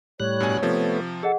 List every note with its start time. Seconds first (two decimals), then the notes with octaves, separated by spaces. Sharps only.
0.20 A2 G3 C#5 F#6
0.40 G2 B2 G#5
0.62 C3 F3 A3 B3
1.23 G#4 A4 D#5 F#5